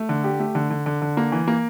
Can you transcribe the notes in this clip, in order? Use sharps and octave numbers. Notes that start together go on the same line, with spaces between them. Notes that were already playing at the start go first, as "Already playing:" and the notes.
Already playing: A3
D3
G4
A3
D3
D3
D3
D3
A#3
E3
A#3